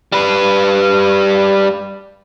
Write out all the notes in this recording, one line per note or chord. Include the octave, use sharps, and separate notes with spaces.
G3 B4